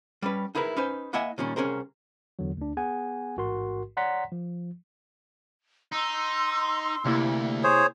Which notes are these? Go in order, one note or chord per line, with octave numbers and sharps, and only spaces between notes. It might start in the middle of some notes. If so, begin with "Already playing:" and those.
G3 C#4 B4
D#4 E4 G#4 A#4 B4
C#4 D#4 B4 C5
A#3 E4 D#5 E5 F#5 G#5
A#2 D#3 G3 C#4
C2 C#4 G#4 A#4 C5
E2 D3 F#3
D2 D4
B3 G#4 F#5 G#5
A1 G#2 F#4 A#4 C6
C#5 D5 F#5 A#5 C6 B6
F3
D#4 C6 E6
D2 C3 A#3 E4
G#4 C5 C#5